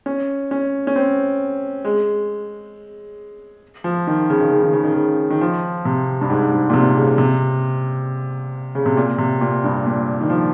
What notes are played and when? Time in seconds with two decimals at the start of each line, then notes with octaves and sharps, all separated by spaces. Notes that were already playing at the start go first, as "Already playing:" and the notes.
0.06 C#4
0.51 C#4
0.87 C#4
0.96 C4
1.85 G#3
3.84 F3
4.07 D#3
4.30 C#3
4.41 D#3
4.52 C#3
4.63 D#3
4.73 C#3
4.84 D#3
4.94 C#3
5.30 D#3
5.41 F3
5.85 C3
6.21 G2
6.30 G#2
6.51 G#2
6.70 A#2
6.73 C3
6.96 C#3
7.18 C3
8.75 C#3
8.86 C3
8.97 A#2
9.18 C3
9.41 A#2
9.64 G2
9.86 A#2
10.21 D#3
10.30 F3